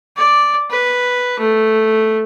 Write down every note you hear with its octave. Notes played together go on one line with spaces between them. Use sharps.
D5
B4
A3